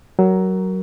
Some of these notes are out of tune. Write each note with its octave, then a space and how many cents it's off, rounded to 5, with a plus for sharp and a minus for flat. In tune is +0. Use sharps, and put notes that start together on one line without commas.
F#3 +20 A#4 +0